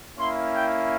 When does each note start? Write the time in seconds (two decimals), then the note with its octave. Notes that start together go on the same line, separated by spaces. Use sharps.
0.17 A#3 C#4 E4 C6
0.54 G5